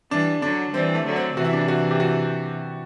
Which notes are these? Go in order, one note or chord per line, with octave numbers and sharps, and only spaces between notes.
E3 G3 D4
D3 F#3 D4
E3 G3 C4
A3
D3 F#3
C4
C3 E3 F#4
E4
D4
E4
F#4
G4
F#4